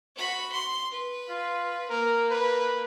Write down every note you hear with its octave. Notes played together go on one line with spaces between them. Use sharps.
F#4 B5
C6
B4
F4
A#3 A#4
B4